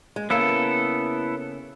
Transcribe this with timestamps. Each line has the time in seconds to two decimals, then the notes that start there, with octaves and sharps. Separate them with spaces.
0.16 G#3
0.30 C#3 A#3 B3 E4 A4